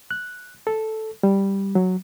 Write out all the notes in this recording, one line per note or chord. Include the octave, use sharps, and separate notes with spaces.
F#6
A4
G3
F#3